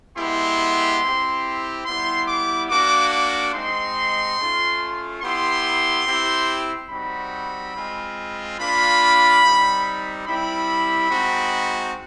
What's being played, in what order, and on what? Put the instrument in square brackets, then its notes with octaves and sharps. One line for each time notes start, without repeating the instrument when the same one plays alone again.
[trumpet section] G#3 B3 E4 G4 C6
C4 E4 G4
G3 B3 E4 G4 C6
D6
A#3 D4 F#4 D6
D6
G#3 C4 D#4 C6
A3 C#4 F4
B3 E4 G4 C6
C4 E4 G4
G3 C4 D#4 F#4 B5
G#3 C4 F4
A#3 D4 F4 B5
G3 C4 D#4 G4
G3 C4 E4 G4 B5
G#3 C4 D#4 F#4